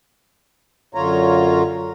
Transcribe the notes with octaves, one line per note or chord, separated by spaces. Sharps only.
F#2 D3 F4 C#5 A#5